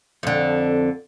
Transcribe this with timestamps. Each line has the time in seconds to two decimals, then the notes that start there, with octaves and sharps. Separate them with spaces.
0.23 F2 D3